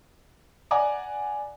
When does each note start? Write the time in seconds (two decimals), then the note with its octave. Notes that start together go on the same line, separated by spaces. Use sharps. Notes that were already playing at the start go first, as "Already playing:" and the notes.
0.71 D5 F#5 G#5 A#5 D6